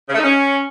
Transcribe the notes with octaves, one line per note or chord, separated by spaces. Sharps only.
C#3
A3
D#4
C#4